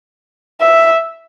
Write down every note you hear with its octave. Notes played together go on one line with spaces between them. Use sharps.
E5